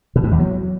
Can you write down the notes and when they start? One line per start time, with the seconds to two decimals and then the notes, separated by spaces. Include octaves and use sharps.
0.16 B2
0.24 G#2
0.32 E2
0.39 F#3